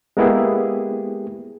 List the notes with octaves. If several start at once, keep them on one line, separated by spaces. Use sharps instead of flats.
G#3 A#3 B3 E4 G4 G#4